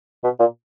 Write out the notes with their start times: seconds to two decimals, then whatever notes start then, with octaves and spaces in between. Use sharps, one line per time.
0.24 B2
0.40 A#2